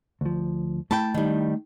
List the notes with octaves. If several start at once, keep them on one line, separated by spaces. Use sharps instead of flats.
D2 F3
A3 E4 G5 A5 B5
D#3 G3